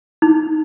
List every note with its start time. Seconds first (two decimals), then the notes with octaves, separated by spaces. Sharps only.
0.22 D#4